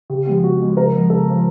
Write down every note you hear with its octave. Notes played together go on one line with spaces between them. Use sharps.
C#3 G4
F3 G#3 B3 G4
C#3 F#4
F3 G#3 B3
C#3 A#4
F3 G#3 B3
C#3 A4
F3 G#3 B3